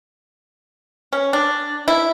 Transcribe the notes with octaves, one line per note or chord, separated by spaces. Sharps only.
C#4
D4
E4